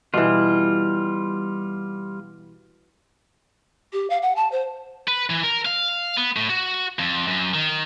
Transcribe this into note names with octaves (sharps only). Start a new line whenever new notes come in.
B2 E3 G3 F4
G4
F5
F#5
A5
C5
B4
E3
A#4
F5
B3
A2
F#4
F2
F#2
D#3